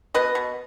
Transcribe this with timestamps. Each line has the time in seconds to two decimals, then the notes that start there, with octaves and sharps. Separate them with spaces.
0.14 B2 B4 D#5
0.35 B2